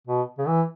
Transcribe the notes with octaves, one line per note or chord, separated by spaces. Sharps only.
B2
C#3
E3